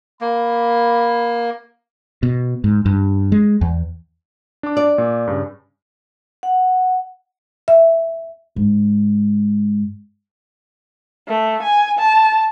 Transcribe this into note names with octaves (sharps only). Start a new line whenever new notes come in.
A#3 B5
B2
G#2
G2
G#3
E2
D4 D6
D5
A#2
G2 C#3
F#5
E5
G#2
A3
G#5
A5